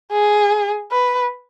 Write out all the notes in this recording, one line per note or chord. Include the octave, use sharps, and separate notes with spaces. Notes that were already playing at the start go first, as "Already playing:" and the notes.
G#4
B4